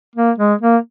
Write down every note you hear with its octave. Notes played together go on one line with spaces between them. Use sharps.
A#3
G#3
A#3